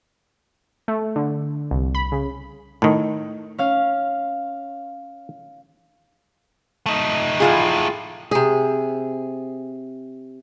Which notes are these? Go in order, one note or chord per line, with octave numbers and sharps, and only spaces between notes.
A3
D3
C2
B5
C#3
A2 D#3
C#4 F5
A3 D#4
A2 F4 G#4
C3 G#4